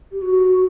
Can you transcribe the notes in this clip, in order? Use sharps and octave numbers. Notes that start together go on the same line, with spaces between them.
G4
F#4